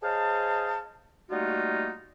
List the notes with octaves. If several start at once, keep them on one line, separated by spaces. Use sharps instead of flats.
G#4 C5 C#5 D#5 F5 A5
G3 A3 A#3 D#4 F4 F#4